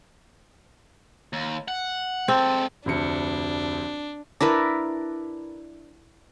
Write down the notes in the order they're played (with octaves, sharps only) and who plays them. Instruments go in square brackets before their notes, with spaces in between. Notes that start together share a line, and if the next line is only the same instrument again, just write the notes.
[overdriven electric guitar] D#2
F#5
[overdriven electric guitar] G#3 A4 [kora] C4
[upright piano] F1 D2 C#7 [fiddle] D4
[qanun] D4 E4 A#4 B4